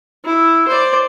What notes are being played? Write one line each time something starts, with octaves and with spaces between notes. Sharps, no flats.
E4
C5 D5